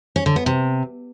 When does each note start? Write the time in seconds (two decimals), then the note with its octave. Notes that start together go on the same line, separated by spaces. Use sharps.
0.16 C#4
0.26 D3
0.36 B3
0.46 C3